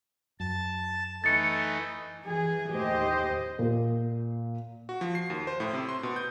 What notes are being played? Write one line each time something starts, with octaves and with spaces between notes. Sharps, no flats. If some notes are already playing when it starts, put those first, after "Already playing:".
F#2 A5
E3 A3 D#4 A6 C#7
E3 G#4
D#2 A2 G4 C5 D#5
A#2
F#4
F3
C7
D#2
C5
A2
C3
C6
B2
G6